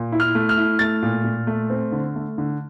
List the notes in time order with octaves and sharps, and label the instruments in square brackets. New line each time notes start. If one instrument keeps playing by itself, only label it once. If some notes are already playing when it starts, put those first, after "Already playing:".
Already playing: [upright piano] A#2
E4
F6
A3
F6
E4
A3 A6
A#2
A#2
A3
C4
D3
A3
D3